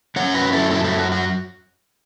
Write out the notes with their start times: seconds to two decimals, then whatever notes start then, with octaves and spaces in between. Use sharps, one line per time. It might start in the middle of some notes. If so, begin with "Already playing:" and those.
0.16 F#2 F#3 C#4 C#5 F#5
0.34 F#4 B4
0.53 E4 A4
0.71 E4 A4
0.84 E4 A4
0.98 F#4
1.12 F#4